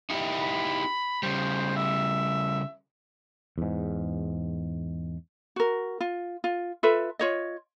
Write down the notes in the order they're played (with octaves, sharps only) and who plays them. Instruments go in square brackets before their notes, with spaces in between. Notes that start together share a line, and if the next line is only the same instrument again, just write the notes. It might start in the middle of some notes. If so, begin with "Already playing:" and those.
[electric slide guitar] D#4 E4 G4
[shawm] B5
[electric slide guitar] C#3 G3 [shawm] C5
[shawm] E5
[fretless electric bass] E2 G#2
[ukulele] F#4 A#4
F4
F4
F4 A4 B4 E5
F4 C#5 D#5